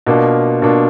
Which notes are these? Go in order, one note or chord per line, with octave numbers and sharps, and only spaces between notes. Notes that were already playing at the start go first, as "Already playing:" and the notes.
B2 A#3 D4 F4
B2 A#3 D4 F4